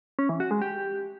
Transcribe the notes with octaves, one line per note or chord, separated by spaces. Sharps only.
C#4
E3
F#4
G#3
G4